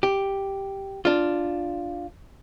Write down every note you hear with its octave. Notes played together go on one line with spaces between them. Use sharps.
G4
D4 F4